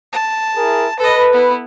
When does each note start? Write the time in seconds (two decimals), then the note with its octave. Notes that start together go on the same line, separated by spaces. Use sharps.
0.13 A5
0.55 E4 G#4 A#4
0.99 A4 B4 D#5
1.33 B3 E4